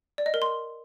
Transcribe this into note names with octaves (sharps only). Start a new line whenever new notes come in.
D5
D#5
A#4
C6